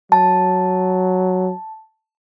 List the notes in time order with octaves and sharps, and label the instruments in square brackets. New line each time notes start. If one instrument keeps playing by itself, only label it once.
[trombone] F#3 [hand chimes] A5